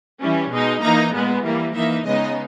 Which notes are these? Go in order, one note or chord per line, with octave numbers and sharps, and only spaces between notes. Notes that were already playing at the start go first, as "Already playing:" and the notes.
E3 G3 C#4
B2 G#3 D#4
E3 A#3 D#4 A#5
A#2 G#3 B3
E3 G3 A#3
E3 A#3 D#4 E5
C#3 G#3 B3 D#4 D#5